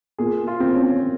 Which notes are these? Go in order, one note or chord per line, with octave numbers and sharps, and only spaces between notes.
A#2 G#4
F4
C4
C#4